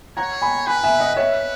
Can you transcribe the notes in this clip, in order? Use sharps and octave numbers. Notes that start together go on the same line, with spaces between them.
C#5 F#5 A#5
G#5 B5
B4 G#5 B5
E5 G#5
D#5 F#5
B4 C#5 E5